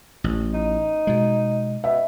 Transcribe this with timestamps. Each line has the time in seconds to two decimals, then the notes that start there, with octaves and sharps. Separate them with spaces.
0.24 A1
0.54 D#4
1.07 B2 G#3
1.84 B2 E5